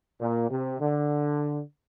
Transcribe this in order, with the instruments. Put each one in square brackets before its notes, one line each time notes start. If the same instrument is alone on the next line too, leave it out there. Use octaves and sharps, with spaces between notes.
[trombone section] A#2
C3
D3